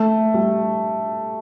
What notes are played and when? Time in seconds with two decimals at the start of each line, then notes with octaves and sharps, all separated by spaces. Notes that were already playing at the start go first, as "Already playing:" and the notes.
Already playing: A3
0.34 G3